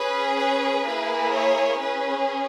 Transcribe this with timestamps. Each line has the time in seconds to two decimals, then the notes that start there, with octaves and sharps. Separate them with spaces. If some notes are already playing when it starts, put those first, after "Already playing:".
Already playing: C#4 G#4 B4
0.37 B4
0.85 A#3 E4 G#4
1.33 C#5
1.80 C#4 G#4 B4